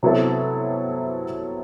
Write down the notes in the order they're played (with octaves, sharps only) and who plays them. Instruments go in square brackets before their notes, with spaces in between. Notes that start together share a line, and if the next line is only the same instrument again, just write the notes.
[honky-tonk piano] C3 F#3 B3 E4 A4